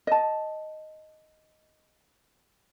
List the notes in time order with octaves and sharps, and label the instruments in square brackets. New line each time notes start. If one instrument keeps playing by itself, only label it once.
[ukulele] D#5 A5